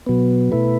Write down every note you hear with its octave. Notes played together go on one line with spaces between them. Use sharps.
B2 F#3 B3
B2 A3 E4 B4